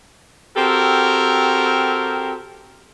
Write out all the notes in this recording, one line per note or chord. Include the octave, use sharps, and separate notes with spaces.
C4 F#4 G4 A4 A#4